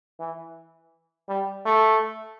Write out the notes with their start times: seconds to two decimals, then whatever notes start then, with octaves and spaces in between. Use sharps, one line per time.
0.20 E3
1.29 G3
1.65 A3